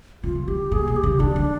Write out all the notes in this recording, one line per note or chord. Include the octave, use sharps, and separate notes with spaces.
C#3 F4
E3
D3 G4
A#2 G#4
B2
G4
C#3
D3 D4
D#3